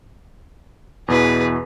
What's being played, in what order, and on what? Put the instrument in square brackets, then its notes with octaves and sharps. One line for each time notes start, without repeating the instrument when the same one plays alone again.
[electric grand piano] E2 B2 E3 [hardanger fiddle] G#4 B4